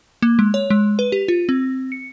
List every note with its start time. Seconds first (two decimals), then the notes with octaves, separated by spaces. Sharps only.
0.22 A#3
0.39 G#3
0.54 C#5
0.70 G#3
0.99 B4
1.12 G4
1.28 F4
1.49 C4
1.92 C#7